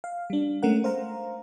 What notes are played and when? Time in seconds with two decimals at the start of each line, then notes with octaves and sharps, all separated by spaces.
0.04 F5
0.30 G3 D4
0.63 G#3 A3 C#4 A#4 F#5
0.84 C5 F5 A#5